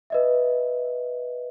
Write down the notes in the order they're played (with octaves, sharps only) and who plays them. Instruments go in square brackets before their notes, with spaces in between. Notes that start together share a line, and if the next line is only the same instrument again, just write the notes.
[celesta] B4 D#5 E5